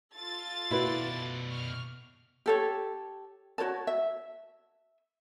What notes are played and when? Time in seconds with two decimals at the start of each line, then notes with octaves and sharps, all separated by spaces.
0.15 F4 A4 A6
0.71 B2 E4 F#4 B4 D5
1.49 C#6 F6
2.46 G4 A4 C#5
3.58 F#4 C5 C#5 A5
3.87 E5